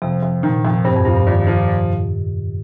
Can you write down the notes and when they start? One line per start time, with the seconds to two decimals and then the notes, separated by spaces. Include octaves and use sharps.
0.02 F2 C3
0.23 F2
0.43 A#2 D#3
0.65 F2
0.85 G2 C4
0.96 F2
1.05 G2 F3
1.16 G2
1.27 A#2 D#3
1.47 F3